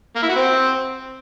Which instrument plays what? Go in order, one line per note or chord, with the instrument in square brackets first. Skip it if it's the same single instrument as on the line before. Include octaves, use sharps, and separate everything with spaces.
[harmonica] A#3
E4
F#4
C4